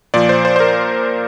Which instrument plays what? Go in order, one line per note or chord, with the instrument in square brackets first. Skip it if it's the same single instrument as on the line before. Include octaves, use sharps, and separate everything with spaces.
[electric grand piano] A#2 F3 D5
C5
C5
C5
A#4